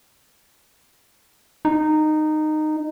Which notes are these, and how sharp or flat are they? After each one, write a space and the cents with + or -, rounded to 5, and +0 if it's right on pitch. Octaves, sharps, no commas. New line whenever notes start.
D#4 -15